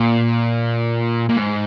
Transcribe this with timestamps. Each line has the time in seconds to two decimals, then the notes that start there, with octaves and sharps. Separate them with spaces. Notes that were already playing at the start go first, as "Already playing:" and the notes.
Already playing: A#2
1.29 A#2
1.37 G#2